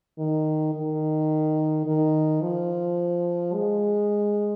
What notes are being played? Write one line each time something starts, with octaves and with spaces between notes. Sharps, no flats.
D#3
D#3
D#3
F3
G#3